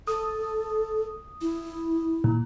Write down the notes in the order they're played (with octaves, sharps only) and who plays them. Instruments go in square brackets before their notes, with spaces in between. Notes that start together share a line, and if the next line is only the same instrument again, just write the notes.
[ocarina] A4 [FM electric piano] D#6
[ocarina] E4
[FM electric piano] A#2